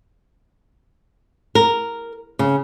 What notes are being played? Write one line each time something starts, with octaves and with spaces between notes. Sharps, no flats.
A#4
C#3